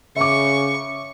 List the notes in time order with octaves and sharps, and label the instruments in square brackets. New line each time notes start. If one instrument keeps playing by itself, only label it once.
[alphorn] C#3 [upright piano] E5 D6 [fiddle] C#6